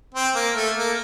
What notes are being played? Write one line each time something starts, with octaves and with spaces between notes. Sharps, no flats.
C4
A#3
A3
A#3